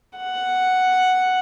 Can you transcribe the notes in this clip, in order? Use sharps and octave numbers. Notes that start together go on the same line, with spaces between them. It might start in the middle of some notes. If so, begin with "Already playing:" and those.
F#5